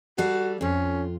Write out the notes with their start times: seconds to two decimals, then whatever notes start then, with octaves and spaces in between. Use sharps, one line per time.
0.18 G3 F#4 A4 F5
0.61 F2 C#4 F4